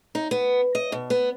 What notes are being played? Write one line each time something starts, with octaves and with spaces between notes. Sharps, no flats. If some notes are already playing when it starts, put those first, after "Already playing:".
D#4
B3
D#5
B2
B3